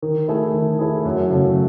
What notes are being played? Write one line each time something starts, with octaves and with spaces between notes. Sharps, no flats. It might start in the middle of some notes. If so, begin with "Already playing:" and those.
D#3
A3 E4 G#4
D#3
A3 E4 G#4
F#2
C#3 F#3 A3